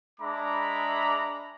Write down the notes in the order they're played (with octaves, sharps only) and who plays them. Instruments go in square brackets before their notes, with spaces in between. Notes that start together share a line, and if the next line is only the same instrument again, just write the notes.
[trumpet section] G#3 D4 E5 A#5 B5 D6